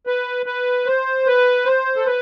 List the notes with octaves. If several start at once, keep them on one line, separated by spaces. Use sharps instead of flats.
B4
B4
C5
B4
C5
A4
B4